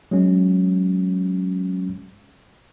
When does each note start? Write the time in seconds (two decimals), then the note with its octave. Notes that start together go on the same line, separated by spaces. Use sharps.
0.11 F#3 G#3 C#4